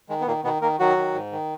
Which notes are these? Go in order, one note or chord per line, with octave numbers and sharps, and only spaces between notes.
D#3 G#3
B3
A#2 D#3 A#3
B2 D#3 B3
D#3 A#3 A#4
D#3 F#3 F#4
D#3
G#2
D#3